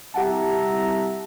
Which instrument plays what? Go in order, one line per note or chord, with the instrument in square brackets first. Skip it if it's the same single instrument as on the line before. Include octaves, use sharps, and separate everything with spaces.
[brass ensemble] C2 E5 A#5 [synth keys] G4 F#5 A5